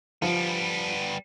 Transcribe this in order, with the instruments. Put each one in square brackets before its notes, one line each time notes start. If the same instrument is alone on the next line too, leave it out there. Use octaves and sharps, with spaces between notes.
[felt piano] F3 [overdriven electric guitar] G3 B3